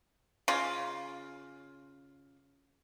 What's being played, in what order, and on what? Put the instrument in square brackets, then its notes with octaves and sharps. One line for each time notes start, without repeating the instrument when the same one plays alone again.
[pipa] C#3 F4